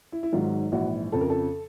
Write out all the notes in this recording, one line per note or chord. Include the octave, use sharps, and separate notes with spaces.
E4
E4
G#1 G#2 D#3 F#3 F4
A#1 G#2 E3 F#4
F2 C#3 F3 A4
A#4
A4